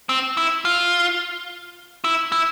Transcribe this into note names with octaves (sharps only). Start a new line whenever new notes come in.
C4
E4
F4
E4
E4